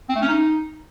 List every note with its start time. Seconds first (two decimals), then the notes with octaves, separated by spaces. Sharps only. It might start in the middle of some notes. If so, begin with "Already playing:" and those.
0.09 C4
0.16 A3
0.22 C#4
0.28 D#4